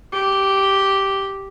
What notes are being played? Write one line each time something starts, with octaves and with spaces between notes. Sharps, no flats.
G4